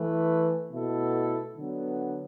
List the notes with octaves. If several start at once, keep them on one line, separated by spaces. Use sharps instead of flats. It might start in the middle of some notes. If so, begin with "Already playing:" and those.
Already playing: E3 A3 E4 B4
B2 A3 E4 A4
D3 F#3 B3